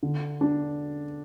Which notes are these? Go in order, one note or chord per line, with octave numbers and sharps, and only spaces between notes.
D3
D4